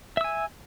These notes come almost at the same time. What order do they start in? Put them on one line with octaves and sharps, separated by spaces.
E5 E6 G#5